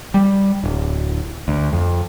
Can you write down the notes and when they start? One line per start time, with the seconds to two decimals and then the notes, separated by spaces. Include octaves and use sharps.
0.14 G3
0.64 D1
1.48 D2
1.73 F2